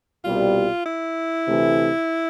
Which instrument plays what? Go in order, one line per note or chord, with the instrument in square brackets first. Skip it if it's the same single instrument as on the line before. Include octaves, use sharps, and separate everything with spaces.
[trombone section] C2 B2 G3 [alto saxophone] F4
[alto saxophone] E4
[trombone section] D2 C3 E3 A3